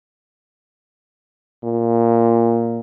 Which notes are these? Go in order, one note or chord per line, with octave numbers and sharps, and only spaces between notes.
A#2